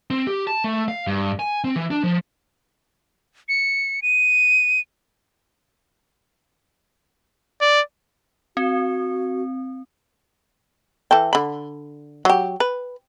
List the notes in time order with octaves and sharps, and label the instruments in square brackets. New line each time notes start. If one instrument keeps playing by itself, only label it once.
[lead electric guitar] C4
G4
A5
A3
F5
G2
G#5
C4
E3
D4
F3
[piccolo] C#7
D#7
[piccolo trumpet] D5
[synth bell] C4 [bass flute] F#4
[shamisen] E3 A4 G5
D3 B5
F#3 G4
B4